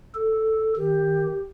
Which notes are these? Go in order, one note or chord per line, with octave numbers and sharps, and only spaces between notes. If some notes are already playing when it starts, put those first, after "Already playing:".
A4
D#3 G4